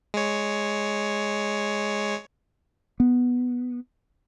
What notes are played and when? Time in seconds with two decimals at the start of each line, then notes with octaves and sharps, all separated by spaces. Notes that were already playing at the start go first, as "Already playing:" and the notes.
0.14 G#3 C#5
3.00 B3